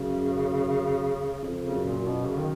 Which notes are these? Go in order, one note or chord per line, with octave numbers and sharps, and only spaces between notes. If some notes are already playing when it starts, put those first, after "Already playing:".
Already playing: F#2 C#3
F2
C#3
F#2
A#2
F#2
B2
C#3
D#3